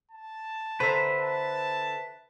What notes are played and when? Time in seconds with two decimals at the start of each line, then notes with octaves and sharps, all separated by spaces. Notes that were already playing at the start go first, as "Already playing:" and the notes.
0.11 A5
0.80 D3 B4 C5 E5 A#5
1.21 A5